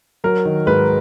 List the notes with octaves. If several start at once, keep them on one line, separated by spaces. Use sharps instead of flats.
F#3 A#4
D#3
G#2 B4